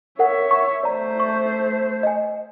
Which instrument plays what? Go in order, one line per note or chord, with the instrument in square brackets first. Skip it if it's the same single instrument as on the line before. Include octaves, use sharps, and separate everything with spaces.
[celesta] A#4 F#5 [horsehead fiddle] C#5 E5
[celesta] C#6
[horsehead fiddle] A3 C5 [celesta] D5 A#5
[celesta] C#6
D#5 G#5